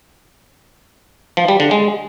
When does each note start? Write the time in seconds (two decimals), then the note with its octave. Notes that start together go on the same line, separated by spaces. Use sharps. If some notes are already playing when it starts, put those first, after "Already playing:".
1.37 F3
1.48 G3
1.60 D3
1.71 G#3